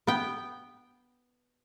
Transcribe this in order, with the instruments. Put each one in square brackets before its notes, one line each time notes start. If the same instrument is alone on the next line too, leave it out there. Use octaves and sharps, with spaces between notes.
[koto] B3 G5